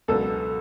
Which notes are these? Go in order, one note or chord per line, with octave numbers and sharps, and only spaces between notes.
C#2 B2 F#3 B3 D4 A4